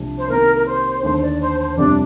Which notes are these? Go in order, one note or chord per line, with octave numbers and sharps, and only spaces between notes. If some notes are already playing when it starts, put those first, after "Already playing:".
Already playing: C2 C3 F3 A3 D4
C5
C3 D#3 A#3 A#4
A#4
C5
D#2 D3 A3 C5
D5
C5
C5
F2 C3 G3 D4